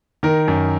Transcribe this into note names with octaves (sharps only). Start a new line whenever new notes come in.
D#3 A#4
F#2